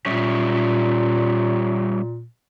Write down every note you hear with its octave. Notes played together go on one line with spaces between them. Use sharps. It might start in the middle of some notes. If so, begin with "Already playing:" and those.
A#2 G3 C#4 E5